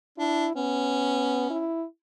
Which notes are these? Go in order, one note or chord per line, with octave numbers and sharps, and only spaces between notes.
D4 E4
B3 C#4
E4